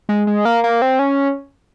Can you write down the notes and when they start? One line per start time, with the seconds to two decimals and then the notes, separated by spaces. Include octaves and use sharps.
0.09 G#3
0.27 G#3
0.45 A#3
0.64 A#3
0.82 C4
0.99 C#4